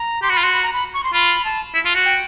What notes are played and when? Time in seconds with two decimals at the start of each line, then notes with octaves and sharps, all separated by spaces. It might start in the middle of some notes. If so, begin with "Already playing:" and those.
Already playing: A#5
0.22 G4 C6
0.29 F#4
0.32 F4 B5
0.43 F#4 C6
0.53 B5
0.63 A#5
0.73 B5
0.94 C#6
1.04 C6
1.13 F4 B5
1.45 A5
1.75 E4
1.85 F4
1.95 F#4
2.05 G5